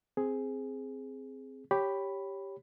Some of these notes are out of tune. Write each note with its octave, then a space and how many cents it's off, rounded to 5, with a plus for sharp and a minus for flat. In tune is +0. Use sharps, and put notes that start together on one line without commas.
C4 +0 G#4 +5
G4 +0 C#5 +0 B5 +0